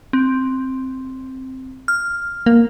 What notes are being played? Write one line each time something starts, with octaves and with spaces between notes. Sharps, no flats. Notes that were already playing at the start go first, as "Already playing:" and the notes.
C4
F6
A#3